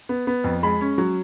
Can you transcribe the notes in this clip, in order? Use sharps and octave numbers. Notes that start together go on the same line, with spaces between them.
B3
B3
F2
G#3 B5
C#4
F#3